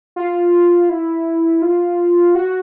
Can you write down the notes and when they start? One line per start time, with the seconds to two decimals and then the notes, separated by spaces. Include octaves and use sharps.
0.16 F4
0.89 E4
1.62 F4
2.35 F#4